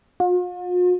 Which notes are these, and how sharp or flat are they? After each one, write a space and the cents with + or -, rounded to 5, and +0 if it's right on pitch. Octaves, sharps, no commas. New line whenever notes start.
F4 +45